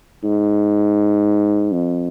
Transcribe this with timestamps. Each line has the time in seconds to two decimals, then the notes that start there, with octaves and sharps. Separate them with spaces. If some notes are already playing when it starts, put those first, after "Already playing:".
0.24 G#2
1.72 F2